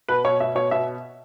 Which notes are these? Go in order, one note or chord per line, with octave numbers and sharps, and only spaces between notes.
B2 B4
B2 C#5
B2 E5
B2 C#5
B2 E5